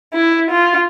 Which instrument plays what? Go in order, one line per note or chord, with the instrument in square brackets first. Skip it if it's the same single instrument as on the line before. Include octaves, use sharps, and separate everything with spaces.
[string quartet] E4
F4